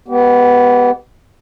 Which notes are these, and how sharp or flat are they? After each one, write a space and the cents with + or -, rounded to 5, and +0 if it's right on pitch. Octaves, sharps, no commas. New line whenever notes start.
G#3 +0 B3 -5 G4 -30